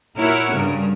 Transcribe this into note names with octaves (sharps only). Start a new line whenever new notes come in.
A#2 E4 F#4 A#4 C#5
G2 C#3 A#4